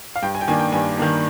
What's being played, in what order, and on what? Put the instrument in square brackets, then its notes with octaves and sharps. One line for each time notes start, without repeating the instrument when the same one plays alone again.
[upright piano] F5
G2 G5
G#5
G5
D#3 A#3 D4 G#5
G5
G2 G#5
D#3 A#3 D4